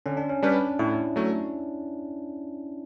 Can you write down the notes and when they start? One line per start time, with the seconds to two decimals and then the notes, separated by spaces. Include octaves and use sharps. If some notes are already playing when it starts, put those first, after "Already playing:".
0.06 D3 C#4
0.17 D4
0.29 C#4
0.42 G3 C#4 D4 G4 B4
0.79 A2 E4
1.16 F#3 A3